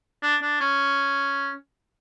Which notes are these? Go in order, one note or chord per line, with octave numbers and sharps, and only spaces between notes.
D4
D4
C#4